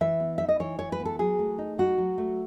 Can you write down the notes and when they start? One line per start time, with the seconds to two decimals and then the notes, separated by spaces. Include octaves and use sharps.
0.01 E3 E5
0.20 B3
0.38 D#4 E5
0.49 D#5
0.60 E3 C#5
0.79 E3 C#5
0.92 B4
1.00 B3
1.05 A4
1.19 F#3 G#4
1.39 A3
1.58 D#4
1.78 F#3 F#4
1.98 F#3
2.18 A3